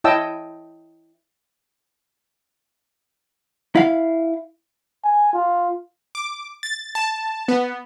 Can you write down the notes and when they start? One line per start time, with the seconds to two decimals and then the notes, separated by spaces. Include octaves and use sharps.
0.04 E4 C#5 D#5 G5 A5 E6
3.75 E4 F5
5.04 G#5
5.33 F4
6.15 D6
6.63 A6
6.95 A5
7.48 B3